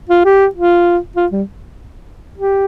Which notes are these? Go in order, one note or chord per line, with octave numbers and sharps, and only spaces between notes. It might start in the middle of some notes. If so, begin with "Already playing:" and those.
F4
G4
F4
F4
G3
G4